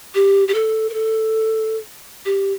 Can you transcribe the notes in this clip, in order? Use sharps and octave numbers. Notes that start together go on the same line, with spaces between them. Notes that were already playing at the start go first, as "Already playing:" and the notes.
G4
G4
A4
A#4
A4
G4